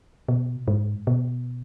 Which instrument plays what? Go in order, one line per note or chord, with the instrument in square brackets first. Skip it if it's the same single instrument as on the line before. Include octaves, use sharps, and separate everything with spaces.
[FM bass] B2
G#2
B2